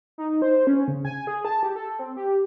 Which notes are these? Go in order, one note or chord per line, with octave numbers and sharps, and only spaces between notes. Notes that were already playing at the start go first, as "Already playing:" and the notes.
D#4
C5
C#4
C#3
G#5
G#4
A5
G4
A4
C4
G4